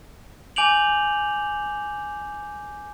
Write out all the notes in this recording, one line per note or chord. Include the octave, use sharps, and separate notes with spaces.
G#5 D6 G6 D7 F7 F#7